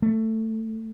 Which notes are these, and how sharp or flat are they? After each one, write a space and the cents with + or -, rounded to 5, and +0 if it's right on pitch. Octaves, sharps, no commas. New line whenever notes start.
A3 +15